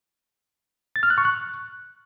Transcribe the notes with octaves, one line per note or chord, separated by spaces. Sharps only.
A6
F6
F#6
C#6
F#6